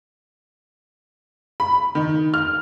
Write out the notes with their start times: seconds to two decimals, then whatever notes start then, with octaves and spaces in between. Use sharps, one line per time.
1.60 B5
1.95 D#3
2.34 F6